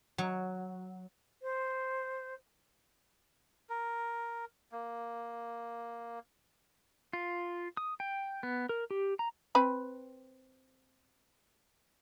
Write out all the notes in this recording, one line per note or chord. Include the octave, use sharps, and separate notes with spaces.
F#3
C5
A#4
A#3
F4
D#6
G5
B3
A#4
G4
A#5
C4 B4 B5